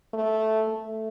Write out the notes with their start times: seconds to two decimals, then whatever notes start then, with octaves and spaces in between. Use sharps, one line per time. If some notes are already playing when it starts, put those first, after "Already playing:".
0.14 A3
0.68 A3